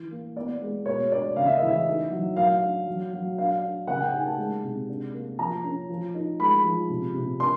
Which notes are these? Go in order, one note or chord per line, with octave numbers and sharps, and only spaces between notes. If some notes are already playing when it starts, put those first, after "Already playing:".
Already playing: E3
A#3
B3 D5
G#3
B2 C#5
D4 D5
C#3 F5
E5
D#5
E3 E5
D#4
F#3
F#3 F5
D4
F#3
F#3
D4 F5
D4
C#3 F#5
G5
D#4 G#5
A5
G#3
C3
D4
A#3
F3 A#5
C#4
F3
D#4
G#3 B5
F3
C3
C3
D4 C6